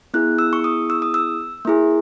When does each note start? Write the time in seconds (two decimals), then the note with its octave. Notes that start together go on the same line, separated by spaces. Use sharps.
0.14 B3 E4 G#4 F#6
0.39 E6
0.53 C#6
0.64 D#6
0.90 E6
1.02 D#6
1.14 E6
1.65 A#3 E4 G#4